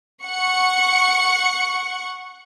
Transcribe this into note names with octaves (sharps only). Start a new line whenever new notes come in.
F#5 C#6 C#7